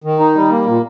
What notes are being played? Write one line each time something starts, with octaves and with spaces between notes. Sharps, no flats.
D#3
D#4
G3
A#3
A#2